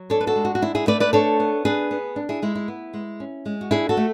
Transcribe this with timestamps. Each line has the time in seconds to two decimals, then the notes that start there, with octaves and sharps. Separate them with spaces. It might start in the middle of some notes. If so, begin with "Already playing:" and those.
Already playing: F#3
0.10 D4 A4 C#5
0.21 B4
0.27 F#4 A4
0.36 G#3
0.45 F#4
0.55 F#4
0.62 D4 E4
0.75 E4 G#4
0.87 A3 B4 D5
1.00 B4 D5
1.13 D4 A4 C#5
1.40 B3
1.65 D4 G#4 B4
1.91 B3
2.16 D4
2.29 E4 G#4
2.42 G#3 E4
2.55 E4
2.68 B3
2.94 G#3
3.20 C#4
3.46 G#3
3.61 F#4
3.71 D4 E4 G#4
3.89 F#4 A4
3.97 A3